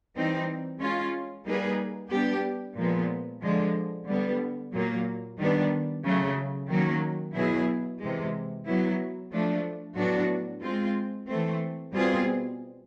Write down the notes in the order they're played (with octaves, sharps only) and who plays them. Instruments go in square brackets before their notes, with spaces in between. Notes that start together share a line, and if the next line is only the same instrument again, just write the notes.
[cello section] E3 G3 C4 D#4
G#3 C#4 F4
G3 A#3 D#4 G#4 B4
G3 B3 D4 G4
A#2 F3 G#3 B3
D3 F3 G#3
D3 G3 B3
A#2 F#3 A#3
D#3 G3 B3 D4
C#3 F#3 A3
D#3 F#3 A#3 C#4
B2 F#3 B3 E4 G#4
C3 E3 G#3
F#3 B3 E4
F3 A3 D4
A2 F#3 B3 D4 F#4
G#3 C4 F4
E3 A3 C4
B2 G3 C4 F4 G#4